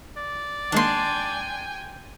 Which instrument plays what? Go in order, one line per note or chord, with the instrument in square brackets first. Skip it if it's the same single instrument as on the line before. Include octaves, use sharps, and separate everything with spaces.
[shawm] D5
[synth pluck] D#3 G#3 A#3 [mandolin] D4 C6 [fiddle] G5 G#5